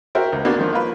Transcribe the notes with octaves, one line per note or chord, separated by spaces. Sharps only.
F#4 A#4 C5 E5 G5
C#2
A#3 B3 D4 F#4
D3 D#3 F3
A#3 F4 B4